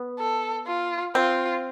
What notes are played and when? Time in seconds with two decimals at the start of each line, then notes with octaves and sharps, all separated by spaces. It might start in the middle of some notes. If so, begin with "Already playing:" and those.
Already playing: B3
0.19 A4
0.67 F4
1.15 C4 F4